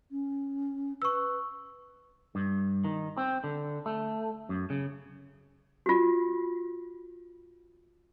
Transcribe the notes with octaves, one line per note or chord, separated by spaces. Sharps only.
C#4
B4 C#6 E6
G2
D#3
C4
D3
A3
F#2
C#3
F4 F#4